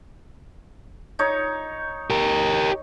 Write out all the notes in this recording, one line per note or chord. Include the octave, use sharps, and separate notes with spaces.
D#4 C#5
G4 A#4